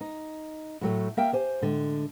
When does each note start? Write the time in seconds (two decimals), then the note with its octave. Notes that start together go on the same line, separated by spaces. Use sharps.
0.01 D#4
0.81 A2 F#3 A3
1.17 A#3 E5 F5 G5
1.33 G4 C5 G#5
1.61 A2 D3 G#3